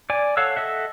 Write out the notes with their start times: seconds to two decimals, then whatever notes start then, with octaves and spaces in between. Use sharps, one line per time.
0.10 D5 G#5
0.37 A4 C#5 F5 F#5 E6
0.56 A4 D#5 E5 F#5